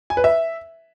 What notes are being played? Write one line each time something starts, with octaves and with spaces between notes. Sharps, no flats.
G#5
B4
E5